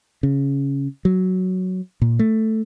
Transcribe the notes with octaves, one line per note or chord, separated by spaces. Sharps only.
C#3
F#3
A#2
A3